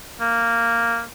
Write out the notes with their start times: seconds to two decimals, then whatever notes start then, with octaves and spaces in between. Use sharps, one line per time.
0.21 A#3